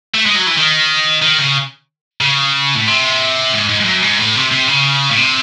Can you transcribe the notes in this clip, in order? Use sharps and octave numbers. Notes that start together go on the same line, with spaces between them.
A3
G#3
F#3
E3
D#3
D#3
C#3
C#3
A2
C3
G#2
G#2
G#2
F#2
G#2
A2
C3
C3
C#3
A2
C3